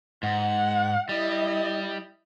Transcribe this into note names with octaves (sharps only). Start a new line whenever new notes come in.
G#2 F#5
G3 E4 D#5